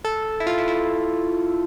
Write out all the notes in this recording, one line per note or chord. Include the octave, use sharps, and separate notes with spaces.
A4
E4
F4
E4
E4